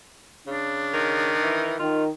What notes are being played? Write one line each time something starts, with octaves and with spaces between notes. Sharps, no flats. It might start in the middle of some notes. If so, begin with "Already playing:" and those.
C#3 D4
D#3
E3
D#3 F4